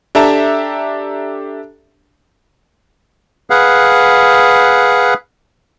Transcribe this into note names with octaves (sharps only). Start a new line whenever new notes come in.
D4 G4 A4 E5 A5 A#5
G#4 B4 F5 F#5